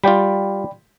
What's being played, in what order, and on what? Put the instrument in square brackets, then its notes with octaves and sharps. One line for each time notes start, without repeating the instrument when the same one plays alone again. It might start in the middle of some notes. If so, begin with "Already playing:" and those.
[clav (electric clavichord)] G3 F4 [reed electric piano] D5 G5 B5